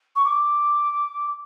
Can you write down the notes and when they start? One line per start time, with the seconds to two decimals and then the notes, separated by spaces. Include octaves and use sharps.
0.15 C#6
0.24 D6